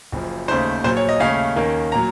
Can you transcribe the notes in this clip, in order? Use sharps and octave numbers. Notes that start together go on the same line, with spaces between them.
F#1 F#2 F3
D#2 C#3 A3 D#4 C5
A#1 A#2 F#3 C5
C#5
D#5
D#2 C#3 A3 C#4 F5
D#2 D#3 A#3 C#4
A#2 F#3 A#5